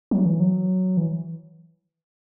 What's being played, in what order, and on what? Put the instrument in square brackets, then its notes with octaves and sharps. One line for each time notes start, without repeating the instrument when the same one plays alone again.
[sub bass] F#3
E3
F#3
E3